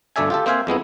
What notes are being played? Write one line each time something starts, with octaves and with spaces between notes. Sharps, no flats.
G1 D2 A3 D5 E5 G#5
F4 G4 A4
A#3 C4 C5 E5 F5 G#5
F2 G#3 B3 E4